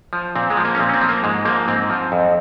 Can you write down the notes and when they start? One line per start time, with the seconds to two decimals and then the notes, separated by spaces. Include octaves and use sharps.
0.13 F3
0.36 A#2 C4
0.50 G#3
0.57 F3
0.65 A#3
0.75 C#4
0.80 A#2 C4
0.89 C#4
0.94 C4
1.02 F3
1.09 A#3
1.24 G#2 G#3
1.45 F3 A#3
1.68 G#2 C4
1.90 F3
2.12 F2